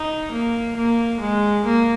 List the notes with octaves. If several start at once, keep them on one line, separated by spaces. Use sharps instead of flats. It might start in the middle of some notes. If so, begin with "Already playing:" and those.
Already playing: D#4
A#3
A#3
G#3
A#3